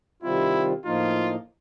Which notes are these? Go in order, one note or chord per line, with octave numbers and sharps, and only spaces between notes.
C3 D#3 G3 C4 E4 F4
A2 F3 A#3 D#4 F4